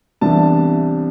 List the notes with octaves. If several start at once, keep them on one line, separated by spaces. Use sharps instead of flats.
C2 C3 E3 B3 D4 A5